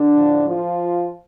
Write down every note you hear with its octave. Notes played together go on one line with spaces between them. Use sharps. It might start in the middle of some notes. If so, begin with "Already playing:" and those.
Already playing: D3 D4
A2 F3
F3 F4